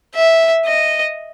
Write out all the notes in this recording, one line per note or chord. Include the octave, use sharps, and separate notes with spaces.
E5
D#5